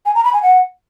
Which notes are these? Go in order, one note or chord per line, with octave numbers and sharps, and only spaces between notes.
G#5
A#5
B5
G#5
F#5